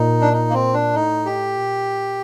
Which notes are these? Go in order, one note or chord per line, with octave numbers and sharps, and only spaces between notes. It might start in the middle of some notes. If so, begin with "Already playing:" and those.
Already playing: A#2 D#4
D4
D#4
A#3
C4
D4
A2 D#4
G4
A#2